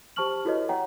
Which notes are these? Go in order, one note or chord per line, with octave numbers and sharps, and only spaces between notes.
G4 C5 A5 C#6 F6 F#7
E4 F#4 A4 B4 C#5 D#5
C#5 F#5 G5 A#5